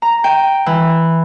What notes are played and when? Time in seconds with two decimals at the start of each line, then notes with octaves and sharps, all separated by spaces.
0.02 A#5
0.24 G5
0.66 E3